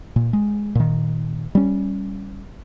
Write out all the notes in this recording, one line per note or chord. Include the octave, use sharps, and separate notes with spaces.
A#2
G#3
A#2 D#3
G3 C#4